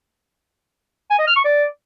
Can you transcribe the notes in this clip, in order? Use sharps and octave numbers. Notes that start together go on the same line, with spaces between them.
G#5
D#5
F6
C#6
D5